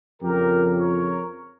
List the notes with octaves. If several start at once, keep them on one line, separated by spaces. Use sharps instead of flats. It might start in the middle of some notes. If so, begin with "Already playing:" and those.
F2 C#3 F3 G4 A#4
A#4 C#5